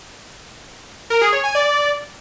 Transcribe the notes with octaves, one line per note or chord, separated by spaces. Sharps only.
A#4
G#4
C#5
G#5
D5